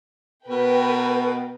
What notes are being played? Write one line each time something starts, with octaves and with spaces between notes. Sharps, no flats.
B2 A#4 B4 G5